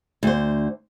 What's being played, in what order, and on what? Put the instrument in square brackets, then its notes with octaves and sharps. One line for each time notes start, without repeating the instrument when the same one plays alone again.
[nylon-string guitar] D2 C5